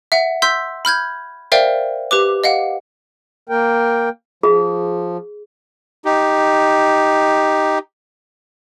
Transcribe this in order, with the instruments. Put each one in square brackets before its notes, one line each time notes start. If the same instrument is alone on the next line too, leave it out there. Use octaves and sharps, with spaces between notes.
[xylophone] E5 F#5
C6 E6 G6 B6
B5 F6 G6 G#6
A#4 C5 D5 E5 F5 G5
G4 B4 D6
D#5 F5 F#5
[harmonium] A#3 A#4 G5
[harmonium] F3 [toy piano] G#4
[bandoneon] D#4 G4